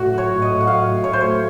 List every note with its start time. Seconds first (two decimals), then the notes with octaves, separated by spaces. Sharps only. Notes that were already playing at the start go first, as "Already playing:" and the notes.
Already playing: A2 F#4
0.12 F#3
0.18 C#5
0.30 A2
0.42 D#5
0.48 A2
0.61 F#5
0.67 F#3 F5
0.86 A2
1.04 F#3 C#5
1.13 C5
1.21 A3 C#5